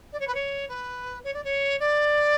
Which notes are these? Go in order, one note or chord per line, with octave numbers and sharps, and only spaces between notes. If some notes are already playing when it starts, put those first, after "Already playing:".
D5
C#5
B4
C#5
B4
C#5
D5
C#5
D5